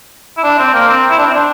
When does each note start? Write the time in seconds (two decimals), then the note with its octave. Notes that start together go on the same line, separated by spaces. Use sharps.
0.37 E4
0.44 D4
0.58 C4
0.73 A#3
0.88 C4
1.10 E4
1.19 D4
1.26 C4
1.34 D4